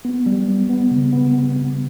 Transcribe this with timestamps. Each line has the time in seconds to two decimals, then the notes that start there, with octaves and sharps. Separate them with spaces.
0.05 B3
0.26 G3
0.47 B3
0.69 B3
0.91 C#3
1.13 B3
1.34 B3
1.56 B3